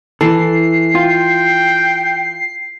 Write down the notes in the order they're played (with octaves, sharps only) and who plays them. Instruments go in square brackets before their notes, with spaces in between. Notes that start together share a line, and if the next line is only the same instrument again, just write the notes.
[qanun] E3 [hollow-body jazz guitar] A4 [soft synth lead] C7
[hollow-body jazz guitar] F4 [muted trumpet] G5